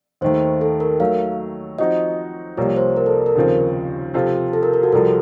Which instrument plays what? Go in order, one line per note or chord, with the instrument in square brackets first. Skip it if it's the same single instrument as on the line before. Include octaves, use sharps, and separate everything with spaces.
[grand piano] D#2 D#3 A3 [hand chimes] C5
[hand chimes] A4
A#4
[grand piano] D#3 F#3 A3 [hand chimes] F5
[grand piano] F3 C4 D#4 F#4 [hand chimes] D#5
[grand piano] C2 C3 F3 A#3 [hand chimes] C#5
[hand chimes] C5
A#4
A4
A#4
[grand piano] D#2 C#3 F3 C4
C3 F3 C4 F4 A4
[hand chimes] A4
A#4
A#4
F#4
[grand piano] C2 C3 F3 [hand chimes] A4